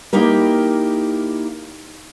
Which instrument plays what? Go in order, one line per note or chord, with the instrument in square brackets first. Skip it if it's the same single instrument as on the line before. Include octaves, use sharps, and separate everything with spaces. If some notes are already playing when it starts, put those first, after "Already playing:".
[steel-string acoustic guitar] A#3 D#4 E4 G4 A#4